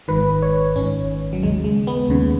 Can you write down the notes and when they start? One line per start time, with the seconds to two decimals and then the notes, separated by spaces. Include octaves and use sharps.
0.08 G#1 G#2 D#3 B4
0.42 C#5
0.76 G#1 G#2 D#3 C#4
1.33 F#3
1.42 D#2 C#3 G#3
1.64 G#3
1.87 B3
2.09 D#2 C#3